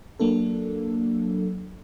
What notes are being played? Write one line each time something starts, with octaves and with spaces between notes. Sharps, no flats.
F#3 A#3 D4 A4